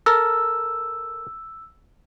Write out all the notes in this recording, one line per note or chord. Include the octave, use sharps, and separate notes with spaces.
A4 A#4 E6